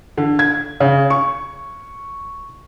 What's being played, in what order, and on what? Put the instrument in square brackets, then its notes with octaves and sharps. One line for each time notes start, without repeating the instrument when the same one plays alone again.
[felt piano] D3
G#6
C#3
C#6